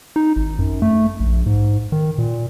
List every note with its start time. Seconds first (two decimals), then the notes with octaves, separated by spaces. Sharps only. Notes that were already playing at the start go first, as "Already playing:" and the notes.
0.16 D#4
0.36 G#1
0.59 F#2
0.82 A3
1.20 A#1
1.46 G#2
1.92 D#3
2.18 A#2